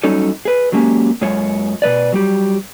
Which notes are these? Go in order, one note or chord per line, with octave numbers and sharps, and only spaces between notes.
F#3 G3 C#4 D#4 A4
G#4 B4
F#3 G#3 A#3 C#4 G4
F#2 G#3 F4 C#5
B2 F3 B4 D5
F#3 G3 G4